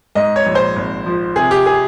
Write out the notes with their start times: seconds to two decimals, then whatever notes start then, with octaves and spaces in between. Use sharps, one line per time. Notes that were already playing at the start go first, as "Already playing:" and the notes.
0.15 G#2 D#5
0.36 C#5
0.46 A#1
0.55 C5
0.76 G#1
1.06 F3
1.36 C3 G#4
1.51 G4
1.66 G#4